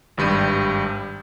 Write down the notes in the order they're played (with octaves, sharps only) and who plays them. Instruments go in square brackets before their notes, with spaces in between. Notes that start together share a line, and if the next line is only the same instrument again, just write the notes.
[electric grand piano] G#1 G2 G3 G6 D#7